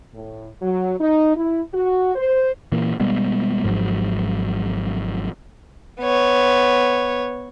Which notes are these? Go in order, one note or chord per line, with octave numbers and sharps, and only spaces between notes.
A2
F#3
D#4
E4
F#4
C5
A#2 E3 A#3
B2 G3 G#3 B3
G#1 G#2 F3 F#3
B3 C#5